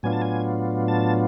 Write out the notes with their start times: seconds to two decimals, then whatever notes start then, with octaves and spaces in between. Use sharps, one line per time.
0.03 A2 F#3 B3 D4 F4 G#5
0.13 A5
0.22 G#5
0.88 A5